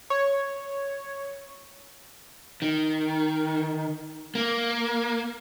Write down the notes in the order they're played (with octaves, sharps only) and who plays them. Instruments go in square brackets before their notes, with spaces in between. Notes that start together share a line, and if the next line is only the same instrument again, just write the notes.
[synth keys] C#5
[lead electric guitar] D#3
A#3